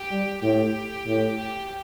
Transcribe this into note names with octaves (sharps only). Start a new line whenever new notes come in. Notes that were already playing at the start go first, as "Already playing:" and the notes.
Already playing: G4
G3
A2 G4
A2
G4